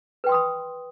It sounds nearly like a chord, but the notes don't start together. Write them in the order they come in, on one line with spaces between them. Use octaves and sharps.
B4 G5 C6 D#6 B5